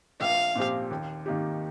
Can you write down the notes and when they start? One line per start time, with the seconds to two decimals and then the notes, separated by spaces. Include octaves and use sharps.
0.21 A#1 F5
0.55 A#2 F3 C4 G4
0.91 D#2
1.26 D#3 A#3 D#4 G4